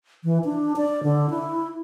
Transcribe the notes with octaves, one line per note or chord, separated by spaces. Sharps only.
E3
D4
D5
D3
E4